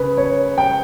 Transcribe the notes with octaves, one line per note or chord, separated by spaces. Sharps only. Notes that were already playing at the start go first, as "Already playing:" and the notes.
Already playing: C#3 B4
C#5
G5